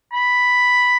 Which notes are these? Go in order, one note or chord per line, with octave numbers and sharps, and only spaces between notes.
B5